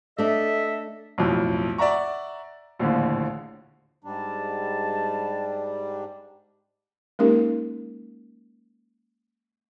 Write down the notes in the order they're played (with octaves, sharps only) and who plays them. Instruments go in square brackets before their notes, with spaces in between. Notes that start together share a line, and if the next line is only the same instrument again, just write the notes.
[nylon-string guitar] A3 D4 [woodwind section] A4 D#5 E5
[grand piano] B1 F2 A2
D5 E5 F#5 A#5 C#6
A#1 D#2 A2 D3
[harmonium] G#2 G3 D4 [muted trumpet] A5
[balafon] G#3 A#3 C#4 D#4 G4 A#4